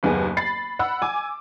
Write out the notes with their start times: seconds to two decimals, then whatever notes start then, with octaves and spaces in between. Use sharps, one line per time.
0.03 F#1 D#2 B3 G#4
0.37 B5 A6 C7
0.79 F#5 B5 E6
1.02 G#5 D6